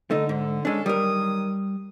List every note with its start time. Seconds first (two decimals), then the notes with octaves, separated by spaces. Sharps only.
0.11 D3 A3 D#4
0.29 G#2
0.65 G#3 C#4 D4 A4
0.86 D#3 F#3 G3 A#4 D#6